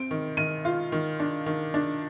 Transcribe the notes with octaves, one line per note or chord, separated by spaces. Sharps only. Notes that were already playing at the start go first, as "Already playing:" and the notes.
Already playing: C4 D7
D#3
D#3 D#7
F4
D#3
D4
D#3
D4